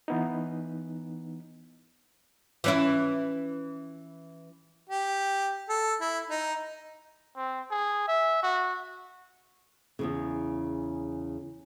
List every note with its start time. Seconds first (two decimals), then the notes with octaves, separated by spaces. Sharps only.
0.08 E3 B3 D#4
2.64 E3 C#4 E4
4.90 G4
5.69 A4
6.01 E4
6.31 D#4
7.36 C4
7.71 G#4
8.08 E5
8.43 F#4
9.99 E2 G2 C#3